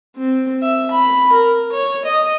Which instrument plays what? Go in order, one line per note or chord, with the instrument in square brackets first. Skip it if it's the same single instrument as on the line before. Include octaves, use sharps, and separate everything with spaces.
[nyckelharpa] C4
E5
B5
A#4
C#5
D#5